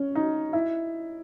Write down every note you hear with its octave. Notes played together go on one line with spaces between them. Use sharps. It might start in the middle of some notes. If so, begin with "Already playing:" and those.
Already playing: C#4
D#4
E4